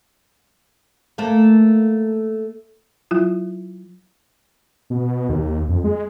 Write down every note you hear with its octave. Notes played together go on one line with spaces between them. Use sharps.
A3 A#3
F#3 E4 F4
B2
D#2
F2
G#3